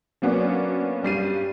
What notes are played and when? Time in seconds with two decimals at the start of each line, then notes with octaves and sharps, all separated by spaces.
0.22 F#3 A#3 B3 C#4 D4
1.03 G2 G3 C7 D#7